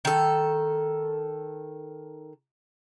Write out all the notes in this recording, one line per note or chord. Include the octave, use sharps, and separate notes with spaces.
D#3 A4